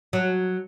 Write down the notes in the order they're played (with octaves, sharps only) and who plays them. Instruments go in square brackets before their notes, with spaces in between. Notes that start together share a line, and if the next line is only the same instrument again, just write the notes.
[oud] F#3